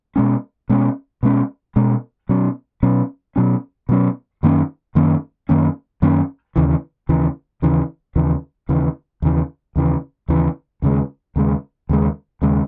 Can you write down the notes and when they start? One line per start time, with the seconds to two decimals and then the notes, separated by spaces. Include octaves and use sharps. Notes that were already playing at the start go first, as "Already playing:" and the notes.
0.16 B2 G#3 C#4
0.69 B2 G#3 C#4
1.23 B2 G#3 C#4
1.76 B2 G#3 C#4
2.29 B2 F#3 C#4
2.83 B2 F#3 C#4
3.36 B2 F#3 C#4
3.89 B2 F#3 C#4
4.43 F#2 D#3 A#3 C#4
4.95 F#2 D#3 A#3 C#4
5.49 F#2 D#3 A#3 C#4
6.02 F#2 D#3 A#3 C#4
6.56 D#2 C#3 E3
7.09 D#2 C#3 E3
7.62 D#2 C#3 E3
8.16 D#2 C#3 E3
8.69 D#2 C#3 E3
9.22 D#2 C#3 E3
9.76 D#2 C#3 E3
10.28 D#2 C#3 E3
10.82 D#2 C#3 G#3
11.36 D#2 C#3 G#3
11.89 D#2 C#3 G#3
12.42 D#2 C#3 G#3